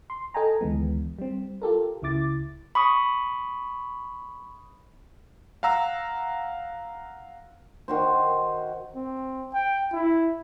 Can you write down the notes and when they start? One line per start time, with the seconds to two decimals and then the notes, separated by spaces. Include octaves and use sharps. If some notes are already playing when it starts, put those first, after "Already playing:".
0.10 C6
0.34 A4 D#5 G5 G#5 A#5
0.61 D2 D#3 E3 G#3 B3
1.19 G3 C4
1.62 F4 G4 A4 A#4
2.02 C#2 C#3 E4 D6 A6
2.75 B5 C#6 D#6
5.63 F5 F#5 A#5 E6
7.88 D#3 F#4 C5
8.95 C4
9.53 G5
9.92 E4